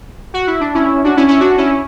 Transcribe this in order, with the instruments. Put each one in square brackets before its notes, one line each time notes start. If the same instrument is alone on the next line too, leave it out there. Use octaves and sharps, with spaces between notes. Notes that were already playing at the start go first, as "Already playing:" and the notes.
[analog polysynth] F#4
E4
D4
C#4 E4
D4 F#4
C#4 E4
C#4 E4
D4 F#4
C#4 E4